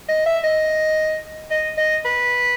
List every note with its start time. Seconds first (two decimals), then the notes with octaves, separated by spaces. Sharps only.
0.09 D#5
0.26 E5
0.44 D#5
1.51 D#5
1.77 D#5
2.05 B4